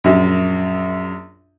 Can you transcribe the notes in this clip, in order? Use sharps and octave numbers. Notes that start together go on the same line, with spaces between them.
A#1 F#2